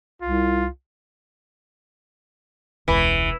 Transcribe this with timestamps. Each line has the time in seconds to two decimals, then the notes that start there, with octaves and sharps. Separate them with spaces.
0.22 C2 F4
2.88 E1 C#2 E3